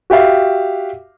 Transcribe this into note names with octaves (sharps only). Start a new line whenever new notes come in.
F#4 G4 E5 F5